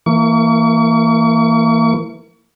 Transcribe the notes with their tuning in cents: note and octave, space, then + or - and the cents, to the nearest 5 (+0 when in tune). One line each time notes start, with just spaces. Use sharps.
E3 +0 A#3 -25 C#6 +40